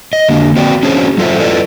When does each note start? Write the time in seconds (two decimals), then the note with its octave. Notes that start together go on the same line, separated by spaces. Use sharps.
0.13 D#5
0.28 D3 A#3 D4
0.56 C4 F#4 D5 G5
0.83 C#4 D4 F#4 G#4 C5 C#5
1.18 F#3 F4 A4 C5 E5
1.40 E4 F4 A4 B4 D5 D#5